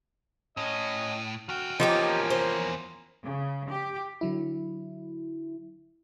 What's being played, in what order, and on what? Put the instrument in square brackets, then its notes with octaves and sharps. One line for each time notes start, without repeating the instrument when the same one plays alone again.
[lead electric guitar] A2 [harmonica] C#4 D#5 D#6
[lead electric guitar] E2 G5 [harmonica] F#4 F6
[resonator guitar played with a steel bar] F3 [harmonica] A#3 C#4 A#4 [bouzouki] D#4 F#4 G4
[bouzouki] C5
[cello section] C#3
G4
[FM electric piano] D3 F#3 E4